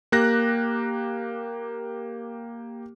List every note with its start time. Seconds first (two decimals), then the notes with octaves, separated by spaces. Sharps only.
0.12 A#3 G4 F#6 A#6